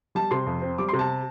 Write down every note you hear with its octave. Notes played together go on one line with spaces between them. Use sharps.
G3 A5
C3 C6
F2
C4
G3 D6
C3 C6
A5